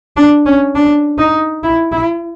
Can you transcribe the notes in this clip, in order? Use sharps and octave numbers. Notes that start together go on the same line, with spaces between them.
D4
C#4
D4
D#4
E4
E4